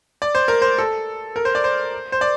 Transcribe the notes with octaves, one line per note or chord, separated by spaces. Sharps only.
D5
C5
A#4
C5
A4
A#4
C5
D5
C5
C5
D5